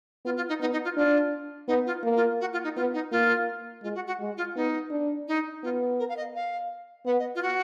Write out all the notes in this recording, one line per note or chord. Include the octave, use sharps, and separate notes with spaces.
B3 F4
F4
D#4
B3 D#4
D#4
F4
D4 F4
B3 D#4
F4
A#3
F4
F#4
F4
D#4
B3 F4
D#4
A#3 F4
G#3 F4
F#4
F#4
G#3
F4
B3 D#4
D4
D#4
B3 F4
A#4
F5
D#5
F5
B3 F#5
D#5
F4
F#4